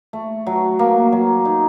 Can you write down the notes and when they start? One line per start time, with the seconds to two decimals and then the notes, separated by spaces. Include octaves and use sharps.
0.13 A3
0.47 F#3
0.79 A#3
1.12 F#3
1.45 D#4